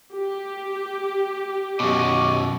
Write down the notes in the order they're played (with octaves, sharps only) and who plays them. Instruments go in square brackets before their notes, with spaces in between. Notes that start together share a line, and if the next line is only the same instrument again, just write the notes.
[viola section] G4
[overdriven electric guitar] F#2 B2 [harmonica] D#5 C#6 D6